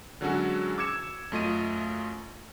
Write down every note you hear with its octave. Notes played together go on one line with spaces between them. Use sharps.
D3 F#3 G#3 C#4 F#4 A4
D6 E6 G#6 C#7 E7
F#2 A3 F4 D#5 D#7